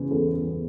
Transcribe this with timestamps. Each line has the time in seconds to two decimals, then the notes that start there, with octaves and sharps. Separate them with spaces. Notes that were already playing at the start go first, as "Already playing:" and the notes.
Already playing: E2 C#3
0.11 E2 A4
0.36 E2